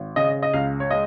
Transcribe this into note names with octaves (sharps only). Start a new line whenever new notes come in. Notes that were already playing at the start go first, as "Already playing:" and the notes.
Already playing: G#1
C#3 D#5
D#5
C#2 F5
C#5
G#3 D#5